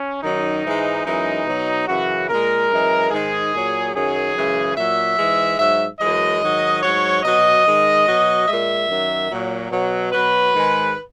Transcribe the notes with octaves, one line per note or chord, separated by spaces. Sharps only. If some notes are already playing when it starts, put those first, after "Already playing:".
Already playing: C#4
F#2 D#3 F#3 D#4
G#2 E3 G#3
F#2 E3 G#3 D#4
B2 F#3
F#2 C#3 E3 F#4
A#2 G#3 A#4
F#2 E3 G#3
G#2 D#3 G#3 G#4
A#2 F#3
F#2 D#3 F#3 G#4
F#2 C#3 E3 G#3
A#2 F#3 E5
G#2 E3 G#3
G#2 F#3 E5
F#2 E3 G#3 D#5
G#2 D#3 F#3
G#2 F#3 C#5
B2 F#3 D#5
G#2 D#3 G#3
B2 F#3
A#2 G#3 E5
F#2 D#3 F#3
A#2 F#3
B2 F#3
B2 F#3 B4
G#2 D#3 G#3